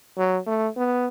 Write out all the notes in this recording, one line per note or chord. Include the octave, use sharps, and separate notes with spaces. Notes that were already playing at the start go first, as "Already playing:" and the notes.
F#3
A3
B3